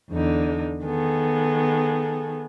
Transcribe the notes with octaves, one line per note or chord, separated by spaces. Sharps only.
E2 D3 D#4
D#3 B3 G#4 A4